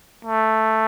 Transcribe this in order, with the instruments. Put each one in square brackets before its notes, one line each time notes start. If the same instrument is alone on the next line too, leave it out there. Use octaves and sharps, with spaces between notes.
[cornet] A3